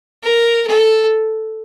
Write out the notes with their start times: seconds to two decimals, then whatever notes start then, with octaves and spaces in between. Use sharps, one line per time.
0.23 A#4
0.66 A4